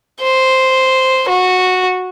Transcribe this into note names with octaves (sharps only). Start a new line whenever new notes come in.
C5
F#4